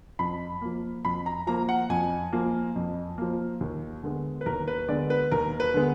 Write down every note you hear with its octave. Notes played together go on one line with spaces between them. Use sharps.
F2 B5
F3 A#3
F2 B5
A#5
F3 A#3 A#5
F#5
F2 G#5
F3 A#3
F2
F3 A#3
D#2
D3 G#3 B3
B4
D#2 A#4
B4
D3 G#3 B3 D5
B4
D#2 A#4
B4
D3 G#3 B3